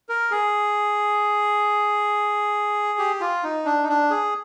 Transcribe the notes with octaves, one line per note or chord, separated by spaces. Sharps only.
A#4
G#4
G4
F4
D#4
D4
D#4
D4
G#4